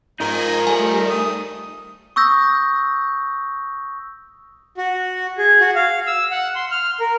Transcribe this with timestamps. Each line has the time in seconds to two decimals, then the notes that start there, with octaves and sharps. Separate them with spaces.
0.20 G#2 F3 D#4 A#4 D#5 G#5
0.67 G3 A3 G#5
1.10 D#6
2.16 C#6 D#6 E6 G6 A#6
4.78 F#4
5.38 G#4
5.61 F#4
5.75 F5
6.07 E6
6.31 F#5
6.55 C6
6.71 F6
7.00 A#4